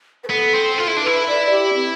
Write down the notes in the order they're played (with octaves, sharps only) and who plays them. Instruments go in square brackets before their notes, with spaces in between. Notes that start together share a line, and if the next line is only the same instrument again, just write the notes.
[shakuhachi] B4
[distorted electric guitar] B3 [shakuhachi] A4
[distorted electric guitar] C4
F4
E4
D4
[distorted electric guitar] E4 [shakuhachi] B4
[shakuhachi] D5
G4
C4